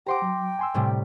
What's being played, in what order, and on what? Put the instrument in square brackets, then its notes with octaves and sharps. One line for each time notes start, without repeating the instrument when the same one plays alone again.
[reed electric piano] G4 C5 F#5 [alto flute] G5 [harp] A#5 C6 D6
[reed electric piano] F#3
G#5 C6 E6
[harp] A2 C3 G3